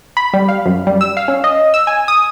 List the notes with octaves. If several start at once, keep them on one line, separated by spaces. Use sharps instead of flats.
B5
G3
F5
F#2
G3
E6
F5
C#4
D#5
E6
G#5
D#6